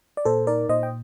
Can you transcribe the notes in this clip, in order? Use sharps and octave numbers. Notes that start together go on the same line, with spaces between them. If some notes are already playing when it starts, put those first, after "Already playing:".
D5
A#2 A4 C5
D#4 A#4 D5
A#2 C5 D#5
G5